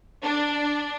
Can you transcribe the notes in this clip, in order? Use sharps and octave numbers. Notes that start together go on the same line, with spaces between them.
D4